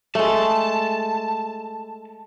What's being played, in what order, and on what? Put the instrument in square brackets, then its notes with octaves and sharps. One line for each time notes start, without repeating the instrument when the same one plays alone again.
[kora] G#3 A3 [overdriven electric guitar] A5